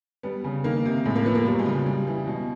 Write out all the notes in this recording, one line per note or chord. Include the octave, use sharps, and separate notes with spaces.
G3 B3
C#3
D#3 A#3
C3
A2 G#3
A#3
F3 B3
A#3
F#3 G3
G#3
C#3
G3
E3
B2